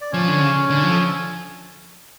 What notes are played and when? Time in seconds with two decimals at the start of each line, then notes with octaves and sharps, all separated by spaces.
0.01 D5
0.12 F3 C#4 C#5
0.28 D3
0.41 C#3
0.70 D3
0.83 F3
0.90 A4